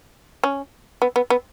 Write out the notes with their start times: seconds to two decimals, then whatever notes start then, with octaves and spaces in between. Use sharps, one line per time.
0.44 C#4
1.02 B3
1.16 B3
1.30 B3